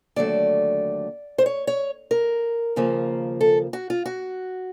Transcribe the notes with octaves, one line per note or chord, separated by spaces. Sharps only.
D#2 D3 F#3 A3 D5
C5
C#5
C#5
A#4
D#2 C#3 F3 A#3
A4
F#4
F4
F#4